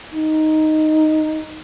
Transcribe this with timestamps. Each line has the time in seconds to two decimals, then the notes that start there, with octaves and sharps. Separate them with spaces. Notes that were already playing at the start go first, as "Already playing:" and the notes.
0.14 D#4